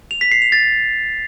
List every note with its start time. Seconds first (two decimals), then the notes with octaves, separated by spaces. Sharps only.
0.11 F7
0.21 B6
0.32 C7
0.42 F7
0.52 A6